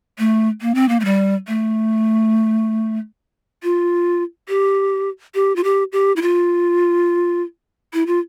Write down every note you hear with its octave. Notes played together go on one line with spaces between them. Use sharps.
A3
A#3
C4
A#3
A3
G3
A3
F4
G4
G4
F4
G4
G4
E4
F4
E4
F4